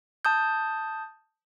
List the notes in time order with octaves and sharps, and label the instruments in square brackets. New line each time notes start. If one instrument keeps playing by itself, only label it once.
[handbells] A5 D#6 G6